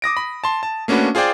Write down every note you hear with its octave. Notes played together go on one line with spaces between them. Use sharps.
D6 D#6 A#6 D7
B5
A5 C6
A5
A3 A#3 C#4 D4 F#4 B4
F4 G#4 C5 D5 G5